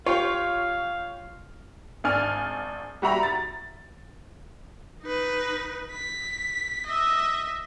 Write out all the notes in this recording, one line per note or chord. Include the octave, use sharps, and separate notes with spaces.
F4 G4 C#5 F5
G#1 D4 G#5 F6
G3 F#4 E5 A#5 B5
A6
D#4 B4
B6
D#5 E5